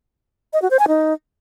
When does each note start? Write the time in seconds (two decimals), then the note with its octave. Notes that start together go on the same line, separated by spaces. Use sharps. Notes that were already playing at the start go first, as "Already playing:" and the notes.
0.53 D#5
0.62 F#4
0.71 C5
0.79 G#5
0.88 D#4